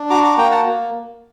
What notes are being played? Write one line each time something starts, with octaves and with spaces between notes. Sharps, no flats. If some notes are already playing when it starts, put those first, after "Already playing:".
Already playing: D4
F#4 A#5 D6
A#5 D6
A#3 G5 A#5
F#5 A5
A#3